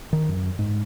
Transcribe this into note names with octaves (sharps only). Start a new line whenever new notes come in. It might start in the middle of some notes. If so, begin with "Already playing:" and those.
D#3
F#2
G#2